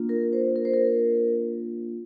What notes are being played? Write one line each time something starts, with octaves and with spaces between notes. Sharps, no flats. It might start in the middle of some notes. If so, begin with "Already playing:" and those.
Already playing: A#3 D4 F4
A#4
C5
A#4
C5
A#4